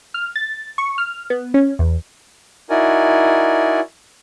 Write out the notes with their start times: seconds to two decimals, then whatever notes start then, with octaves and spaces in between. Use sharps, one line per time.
0.14 F6
0.36 A6
0.78 C#6
0.98 F6
1.30 B3
1.54 C#4
1.79 E2
2.70 D#4 E4 F#4 A#4 D5 G#5